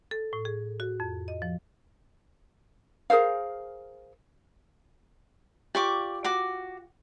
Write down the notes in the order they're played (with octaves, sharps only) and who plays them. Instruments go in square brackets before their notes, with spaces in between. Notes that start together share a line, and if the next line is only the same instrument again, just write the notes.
[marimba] A4
A2
G#4
F#4
F2
D#5
F3
[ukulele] G#4 A#4 C5 F5
[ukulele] F4 G4 [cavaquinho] D5 C#6 D6
[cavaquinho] F#4 D6